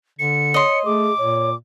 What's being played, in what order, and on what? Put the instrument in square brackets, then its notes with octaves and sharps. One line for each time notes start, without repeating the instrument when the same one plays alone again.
[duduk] D3 [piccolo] C#7
[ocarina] C#5 [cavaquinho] D#5 C6
[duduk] A3 [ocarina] G#4 [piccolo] D6
[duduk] A#2 [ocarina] C#5